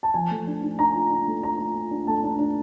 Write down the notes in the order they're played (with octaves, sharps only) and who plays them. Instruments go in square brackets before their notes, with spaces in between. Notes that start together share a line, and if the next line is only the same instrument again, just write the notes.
[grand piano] A5
F3 G#5
A3
D4
D4
D4 A#5
F4
D4
A3
F4 A#5
F4
F4
D4
A3 A5
D4
D4